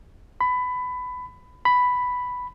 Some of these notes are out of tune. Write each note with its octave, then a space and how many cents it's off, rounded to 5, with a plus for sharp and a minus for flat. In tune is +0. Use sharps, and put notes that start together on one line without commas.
B5 +20
B5 +5